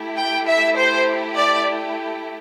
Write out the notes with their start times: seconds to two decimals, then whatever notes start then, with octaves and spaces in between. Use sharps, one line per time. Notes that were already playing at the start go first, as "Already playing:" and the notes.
Already playing: A3 E4 G4
0.17 G5
0.47 E5
0.76 C5
1.36 D5